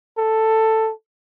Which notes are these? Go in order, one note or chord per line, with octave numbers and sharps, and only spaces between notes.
A4